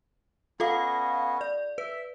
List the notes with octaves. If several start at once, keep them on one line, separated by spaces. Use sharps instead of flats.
B3 C#4 F4 A4 D#5 F5
D5
B4 E5